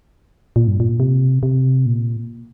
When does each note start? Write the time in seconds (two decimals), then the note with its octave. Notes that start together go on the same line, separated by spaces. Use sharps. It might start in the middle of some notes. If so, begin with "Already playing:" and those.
0.56 A#2
0.68 G2
0.80 A#2
1.00 C3
1.43 C3
1.86 A#2